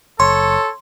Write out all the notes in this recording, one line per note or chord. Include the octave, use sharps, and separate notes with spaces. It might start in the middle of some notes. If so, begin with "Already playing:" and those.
F#1 A4 C#5 C6